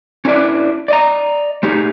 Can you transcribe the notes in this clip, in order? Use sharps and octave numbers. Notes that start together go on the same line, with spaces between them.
C#4 D4 E4 G4 B4 D5
D5 D#5 A#5
A3 D#4 G4 G#4